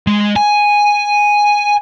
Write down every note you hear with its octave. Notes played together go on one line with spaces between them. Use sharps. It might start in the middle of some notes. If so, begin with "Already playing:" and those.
G#3
G#5